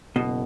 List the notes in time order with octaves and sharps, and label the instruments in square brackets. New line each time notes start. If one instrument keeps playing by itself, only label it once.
[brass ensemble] F#1 [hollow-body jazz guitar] B2